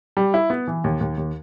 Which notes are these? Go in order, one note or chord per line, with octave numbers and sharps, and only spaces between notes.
G3
E4
B3
E3
D#2
D#2
D#2